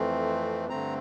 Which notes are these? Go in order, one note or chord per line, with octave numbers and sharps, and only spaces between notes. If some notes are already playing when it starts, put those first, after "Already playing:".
Already playing: F2 E3 A3 C4
G2 D3 A3 C4 A#5